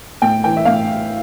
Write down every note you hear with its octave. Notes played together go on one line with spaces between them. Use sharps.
A2 G5
E3 G5
E5
A2 F5